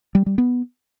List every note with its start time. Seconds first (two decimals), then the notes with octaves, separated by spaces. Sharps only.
0.15 G3
0.26 G3
0.38 B3